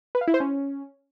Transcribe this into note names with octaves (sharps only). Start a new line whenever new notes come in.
B4
F5
E4
C5
C#4